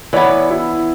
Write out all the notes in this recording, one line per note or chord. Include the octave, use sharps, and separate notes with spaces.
E3 B3 C#5 D5
E4